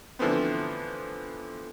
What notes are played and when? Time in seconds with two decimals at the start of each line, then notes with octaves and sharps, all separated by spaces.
0.19 D3 E3 F3 A3 B3 C4